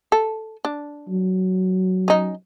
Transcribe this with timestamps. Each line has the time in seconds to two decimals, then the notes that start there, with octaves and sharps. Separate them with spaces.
0.12 A4
0.65 D4
1.09 F#3
2.08 C#4 D#4